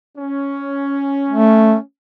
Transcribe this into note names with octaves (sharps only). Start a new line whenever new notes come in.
C#4
A3